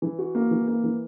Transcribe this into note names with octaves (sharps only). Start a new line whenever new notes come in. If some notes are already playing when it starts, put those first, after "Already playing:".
E3
F#4
A#3
E3
A#3
E3